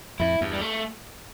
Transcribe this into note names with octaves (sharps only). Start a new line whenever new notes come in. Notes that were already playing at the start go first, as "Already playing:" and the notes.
F2 A2 E4
E2 G2
G3
A3